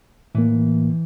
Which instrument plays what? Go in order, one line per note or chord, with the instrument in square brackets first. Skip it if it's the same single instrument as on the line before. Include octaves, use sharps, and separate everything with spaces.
[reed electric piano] A2 A#3 [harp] E3